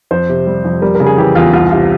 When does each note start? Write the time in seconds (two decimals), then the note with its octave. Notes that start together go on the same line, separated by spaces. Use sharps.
0.11 F2 C5
0.29 C3
0.47 G3
0.65 F2
0.82 G3 A#4
0.95 A#4
1.00 C#3
1.06 G#4
1.18 E3 G4
1.35 E2 F4
1.53 C2 F4
1.71 C3 F4